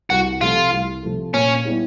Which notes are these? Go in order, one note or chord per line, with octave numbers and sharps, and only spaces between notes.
C2 F#4
C3 F3 A3 F4
C2
C3 F3 A3
A#2 C#4
G3 B3 E4 G4